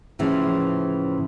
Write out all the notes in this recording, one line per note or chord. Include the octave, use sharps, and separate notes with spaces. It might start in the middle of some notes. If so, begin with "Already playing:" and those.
A2 C#3 E3 F3